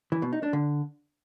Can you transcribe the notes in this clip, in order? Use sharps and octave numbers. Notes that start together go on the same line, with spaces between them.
E3
B2
D#4
D4
D3